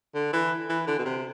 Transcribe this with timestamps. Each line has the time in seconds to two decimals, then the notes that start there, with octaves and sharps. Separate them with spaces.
0.15 D3
0.33 E3
0.69 E3
0.87 D3
0.98 B2
1.05 C3